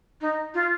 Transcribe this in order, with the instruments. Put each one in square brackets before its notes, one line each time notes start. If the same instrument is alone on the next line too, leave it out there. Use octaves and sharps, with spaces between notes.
[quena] D#4
F4